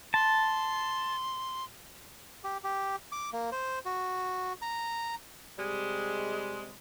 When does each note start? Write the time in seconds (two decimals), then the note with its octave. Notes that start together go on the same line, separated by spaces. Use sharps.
0.14 A5 C6
2.44 G4
2.64 G4
3.12 D6
3.33 A#3
3.52 C5
3.86 F#4
4.62 A#5
5.58 C3 G3 G#3